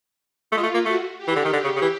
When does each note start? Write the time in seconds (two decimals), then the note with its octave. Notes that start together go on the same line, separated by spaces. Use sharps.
0.51 A3 F4
0.57 G#3
0.63 A3
0.74 A#3
0.85 A3 F#4
1.18 G4
1.27 E3
1.36 D3
1.45 D#3
1.53 D3
1.64 C#3
1.76 C#3
1.82 E3